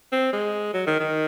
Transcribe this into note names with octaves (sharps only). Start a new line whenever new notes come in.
C4
G#3
F#3
D#3
D#3